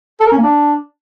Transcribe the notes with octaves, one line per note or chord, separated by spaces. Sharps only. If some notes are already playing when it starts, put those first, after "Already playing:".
A4
A#4
C#4
A#3
D4